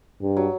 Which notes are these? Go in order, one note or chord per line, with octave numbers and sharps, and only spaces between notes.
G2
F#3